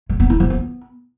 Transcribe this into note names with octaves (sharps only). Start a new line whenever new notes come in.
G#3
B3
E4
F3
B3